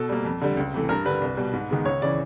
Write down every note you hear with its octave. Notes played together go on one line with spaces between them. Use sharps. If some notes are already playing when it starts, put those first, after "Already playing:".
Already playing: B2 A4
G3 A#3
F2
D3 G3
C#2
C3 E3 A3
G2 A#4
D3 G3 B4
C2
B2 G3
G#2
D#3 G#3 B3
C#2 C#5
C#3 E3 D5